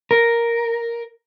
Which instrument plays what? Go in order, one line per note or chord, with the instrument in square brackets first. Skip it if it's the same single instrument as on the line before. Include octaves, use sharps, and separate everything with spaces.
[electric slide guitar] A#4